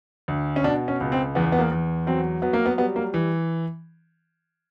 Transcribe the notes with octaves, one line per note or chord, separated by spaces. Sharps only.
D2
C#4
B2 D4
C#4
C#2
C4
E2 B3
B3
A#3
E2
F#3 C4
F#3 B3
A#3
B3
G3 B3
A#3
E3